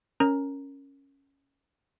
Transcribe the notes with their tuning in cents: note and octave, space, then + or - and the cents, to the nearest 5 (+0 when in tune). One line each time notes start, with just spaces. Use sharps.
C#4 +0 A#4 +0 A#5 +0